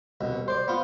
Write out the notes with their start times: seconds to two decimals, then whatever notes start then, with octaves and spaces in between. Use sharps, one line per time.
0.21 C2 B2
0.48 C5 D5
0.68 B3 F4